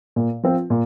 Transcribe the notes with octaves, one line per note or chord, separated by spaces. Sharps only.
A#2
F3 C4 F4
A#2